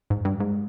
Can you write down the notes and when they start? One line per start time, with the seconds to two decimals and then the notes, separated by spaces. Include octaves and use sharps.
0.10 G#2
0.25 G2
0.40 G#2